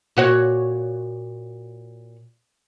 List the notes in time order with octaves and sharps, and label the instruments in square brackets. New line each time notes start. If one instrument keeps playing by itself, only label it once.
[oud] A#2 F#4 C#5